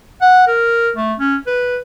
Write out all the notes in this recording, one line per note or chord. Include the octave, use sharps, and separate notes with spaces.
F#5
A#4
A3
C#4
B4